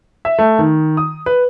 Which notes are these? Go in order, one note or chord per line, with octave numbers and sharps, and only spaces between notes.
E5
A3
D#3
D#6
B4